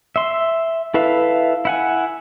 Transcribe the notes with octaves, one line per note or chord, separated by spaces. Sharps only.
E5 C6
E4 A4 B4 E5 F5
E4 F#5 G#5